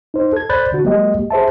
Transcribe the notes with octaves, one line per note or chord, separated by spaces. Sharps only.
D#4 C5
A4 G#6
C5 D5 B5 F#6 G6 A6
D3 F#4
F#3 G#3 A#3 G4 D#5
G#4 C5 E5 A5